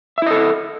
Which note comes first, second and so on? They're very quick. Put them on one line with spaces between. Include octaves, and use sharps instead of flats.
E5 E4 D#5 A4